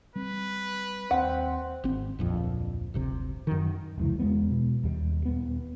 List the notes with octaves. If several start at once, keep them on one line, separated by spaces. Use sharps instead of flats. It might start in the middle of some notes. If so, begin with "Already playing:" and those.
G3 C4 B4
D#2 C4 F#5
G#1 C4
D1 A#1 F2
D1 G1 C3
F#2 D#3
F1 C#2 E3
E2 G#3 B3
B2
D#2 G3
D#1 B3